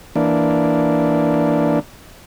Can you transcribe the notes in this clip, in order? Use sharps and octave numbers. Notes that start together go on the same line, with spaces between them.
E3 A#3 D4